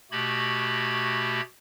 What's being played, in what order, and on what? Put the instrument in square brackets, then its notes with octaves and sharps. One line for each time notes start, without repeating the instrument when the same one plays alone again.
[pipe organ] B2 A3 F#4 G4 B5 G#6